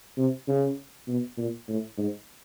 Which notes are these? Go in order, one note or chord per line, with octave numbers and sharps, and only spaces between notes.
C3
C#3
B2
A#2
A2
G#2